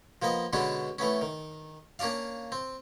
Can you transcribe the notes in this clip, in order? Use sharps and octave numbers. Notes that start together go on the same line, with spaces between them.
F3 A#3 B3 D#5
B2 D3 G#3 B3 C#4 D4
E3 A3 B3 C#4
D#3
A#3 C#4 D4 D5 F5
C4